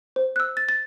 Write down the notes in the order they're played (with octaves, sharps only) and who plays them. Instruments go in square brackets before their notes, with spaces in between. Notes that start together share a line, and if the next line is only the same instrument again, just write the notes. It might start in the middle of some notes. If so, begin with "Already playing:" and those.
[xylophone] C5
E6 F#6
A6
A6